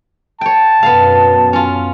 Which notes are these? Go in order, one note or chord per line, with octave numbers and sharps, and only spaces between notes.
C#5 G5 A5
F#2 B2 B3 F5
C#4 F4